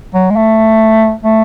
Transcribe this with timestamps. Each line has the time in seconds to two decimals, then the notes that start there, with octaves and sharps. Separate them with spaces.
0.14 F#3
0.30 G#3
0.36 A3
1.23 A3